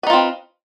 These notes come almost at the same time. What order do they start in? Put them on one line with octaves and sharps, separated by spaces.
B4 D#4 F4 C4